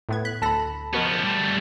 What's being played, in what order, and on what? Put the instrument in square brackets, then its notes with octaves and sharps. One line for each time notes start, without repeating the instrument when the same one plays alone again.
[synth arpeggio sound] A2 B3 G#6
[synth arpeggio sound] F#6 [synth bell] B6
[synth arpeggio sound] D2 A4 A#6 [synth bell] A5 B5
[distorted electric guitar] F3 B3 [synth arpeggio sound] F#4 A#4 D#5
[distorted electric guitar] G3 A3